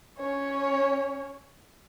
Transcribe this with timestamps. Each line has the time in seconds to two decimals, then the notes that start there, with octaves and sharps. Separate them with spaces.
0.18 C#4 C#5